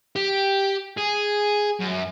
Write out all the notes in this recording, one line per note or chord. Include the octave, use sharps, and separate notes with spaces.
G4
G#4
F#2